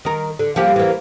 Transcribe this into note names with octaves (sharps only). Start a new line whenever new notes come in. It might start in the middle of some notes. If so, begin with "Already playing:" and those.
D#3 A#4
D3
F3 A#3 G4
E3 A#3